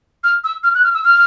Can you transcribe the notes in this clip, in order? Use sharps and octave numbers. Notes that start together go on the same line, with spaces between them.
F6
E6
F6
F#6
F6
E6
F6